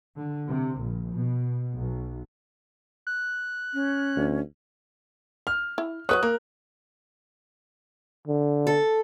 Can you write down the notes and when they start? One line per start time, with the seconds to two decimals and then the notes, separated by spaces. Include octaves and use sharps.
0.16 D3
0.47 C3
0.79 A#1
1.11 B2
1.77 B1
3.07 F#6
3.74 C#4
4.16 D2
5.47 F6
5.78 E4
6.09 F#3 B4 C#5 D#6 F#6
6.23 A#3 A#4
8.27 D3
8.67 A4